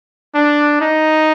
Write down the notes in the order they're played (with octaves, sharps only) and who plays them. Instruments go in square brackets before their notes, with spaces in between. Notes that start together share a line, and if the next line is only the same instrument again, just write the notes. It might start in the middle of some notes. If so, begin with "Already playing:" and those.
[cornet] D4
D#4